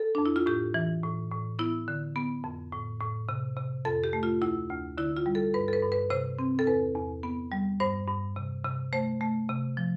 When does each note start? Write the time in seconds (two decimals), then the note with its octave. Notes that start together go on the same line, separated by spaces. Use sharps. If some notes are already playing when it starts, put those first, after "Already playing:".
Already playing: A4
0.15 F2 D4
0.26 E4
0.36 F4
0.46 A2 G4
0.74 E3
1.03 A2
1.31 A2
1.59 B3 E4
1.88 D3
2.16 B3
2.44 F2
2.72 A2
3.00 A2
3.29 C3
3.57 C3
3.85 F2 A4
4.04 G4
4.13 A3
4.23 F4
4.41 D2 E4
4.70 D2
4.98 D3 E4
5.17 F4
5.26 G3
5.35 A4
5.54 G2 B4
5.68 A4
5.73 B4
5.83 G2
5.92 B4
6.10 C3 C5
6.39 C4
6.59 A4
6.67 E2 B4
6.95 E2
7.23 B3
7.52 G3
7.80 G2 C5
8.08 G2
8.36 C3
8.65 C3
8.93 A3 C5
9.21 A3
9.49 C3
9.77 F3